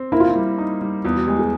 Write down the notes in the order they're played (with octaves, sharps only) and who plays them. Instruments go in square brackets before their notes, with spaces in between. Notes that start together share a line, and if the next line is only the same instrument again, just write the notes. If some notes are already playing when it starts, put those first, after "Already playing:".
Already playing: [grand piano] C4
[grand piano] A#3 [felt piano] E4
[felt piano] F4
E4
[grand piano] G3
D#4
G3
[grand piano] E2 [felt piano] F4
[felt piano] F#4
[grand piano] G#3 [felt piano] G4
[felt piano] G#4